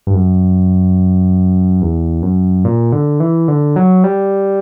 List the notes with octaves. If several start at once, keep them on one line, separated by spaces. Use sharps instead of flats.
G2
F#2
E2
F#2
A#2
D3
E3
D3
F#3
G3